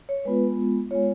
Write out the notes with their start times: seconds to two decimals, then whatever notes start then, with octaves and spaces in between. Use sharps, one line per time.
0.09 C#5
0.25 G#3 B3 F4 B4
0.91 G#3 B3 F4 C#5